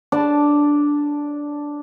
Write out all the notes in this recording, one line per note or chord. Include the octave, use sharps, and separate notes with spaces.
D4 D5 A5